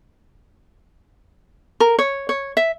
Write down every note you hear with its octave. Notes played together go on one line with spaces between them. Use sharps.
A#4
C#5
C#5
E5